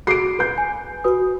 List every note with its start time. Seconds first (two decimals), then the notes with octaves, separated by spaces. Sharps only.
0.07 F#4 G#4 D6 C7 D7
0.39 B4 G6
0.58 G#5
1.04 F#4 B4 D#6